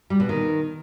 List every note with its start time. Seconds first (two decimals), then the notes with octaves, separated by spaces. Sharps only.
0.10 G3
0.20 B2
0.29 D#3